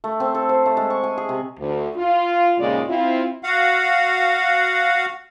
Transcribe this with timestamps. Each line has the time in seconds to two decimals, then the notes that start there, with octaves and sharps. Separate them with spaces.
0.04 A3
0.20 C4
0.35 A4
0.49 C5
0.66 A3
0.77 G#3
0.90 C#6
1.04 G#5
1.18 G#4
1.29 C3
1.59 D2
1.96 F4
2.59 D#2 A#2 C#3 G#3 F4 D5
2.89 C4 E4 F4
3.43 F#4 F5 F#5